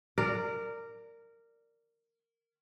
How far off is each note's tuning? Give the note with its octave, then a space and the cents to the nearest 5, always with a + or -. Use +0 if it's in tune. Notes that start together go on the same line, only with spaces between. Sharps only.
A#4 -15 D5 +0